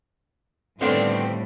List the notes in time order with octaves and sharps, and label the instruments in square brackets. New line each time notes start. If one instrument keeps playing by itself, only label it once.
[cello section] A2 G3 [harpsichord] D3 D#3 B3 [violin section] C4 [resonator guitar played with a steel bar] D4 F4